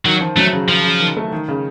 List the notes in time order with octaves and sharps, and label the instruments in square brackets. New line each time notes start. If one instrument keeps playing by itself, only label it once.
[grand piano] D#3 [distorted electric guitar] F#3
[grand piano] F3
[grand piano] F#3 [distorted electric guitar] A3
[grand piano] C#3
[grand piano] C#3 [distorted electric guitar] F3
[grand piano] C#3
D#3
A3
D#3
C#3